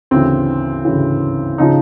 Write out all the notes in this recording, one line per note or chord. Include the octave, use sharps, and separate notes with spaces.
D2 C#3 E3 C4
D2 C#3 E3
C#3 F3 D#4